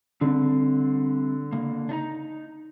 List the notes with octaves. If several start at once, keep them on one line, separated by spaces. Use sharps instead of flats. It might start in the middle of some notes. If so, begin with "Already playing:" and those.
D3 G3 C4
C#3 A#3
D4 D#4 A#5